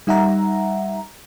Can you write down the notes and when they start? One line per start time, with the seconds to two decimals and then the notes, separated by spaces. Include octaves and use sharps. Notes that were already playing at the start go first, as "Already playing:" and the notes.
0.07 G3 D#4 E5 F#5 A#5